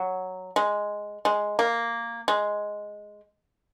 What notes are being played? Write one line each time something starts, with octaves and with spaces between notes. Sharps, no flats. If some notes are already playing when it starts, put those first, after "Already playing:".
Already playing: F#3
G#3
G#3
A#3
G#3